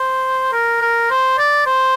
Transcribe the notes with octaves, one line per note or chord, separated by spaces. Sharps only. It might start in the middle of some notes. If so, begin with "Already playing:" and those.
Already playing: C5
A#4
A#4
C5
D5
C5